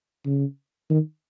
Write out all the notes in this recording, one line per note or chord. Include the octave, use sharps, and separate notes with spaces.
C#3
D#3